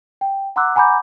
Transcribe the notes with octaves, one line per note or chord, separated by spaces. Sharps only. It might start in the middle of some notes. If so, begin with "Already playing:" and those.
G5
F#5 A#5 C6 D6 E6 F#6
F#5 G#5 A#5 B5 D6 G6